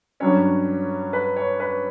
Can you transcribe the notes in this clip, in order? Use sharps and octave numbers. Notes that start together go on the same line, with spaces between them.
G2 F#3 C#4 C#5
B4
C#5
B4